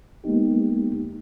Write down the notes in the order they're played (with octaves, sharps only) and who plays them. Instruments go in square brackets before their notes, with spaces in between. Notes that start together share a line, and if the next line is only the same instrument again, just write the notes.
[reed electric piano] G#3 A#3 B3 D#4 G4